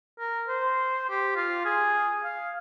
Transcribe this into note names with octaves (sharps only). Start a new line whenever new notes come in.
A#4
C5
G4
F4
G#4
F5